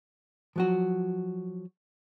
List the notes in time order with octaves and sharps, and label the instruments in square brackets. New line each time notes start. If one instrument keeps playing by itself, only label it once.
[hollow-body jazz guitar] F3 F#3 F#4